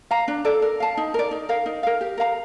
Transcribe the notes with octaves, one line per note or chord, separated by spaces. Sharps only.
F5 A#5
D4
A4 D5
A#4
F5 A5
D#4
A#4 D5
D#4
A#4 F5
D#4
A#4 F5
G4
A#4 F5 A#5